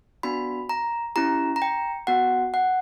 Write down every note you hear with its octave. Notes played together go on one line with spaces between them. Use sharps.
B3 D4 F#4 B5
A#5
C#4 E4 G4 A#5
A#5
G5
B3 F#4 F#5
F#5